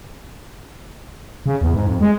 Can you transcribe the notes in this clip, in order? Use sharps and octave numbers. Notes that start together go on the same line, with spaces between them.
C#3
E2
G#2
F2
G#3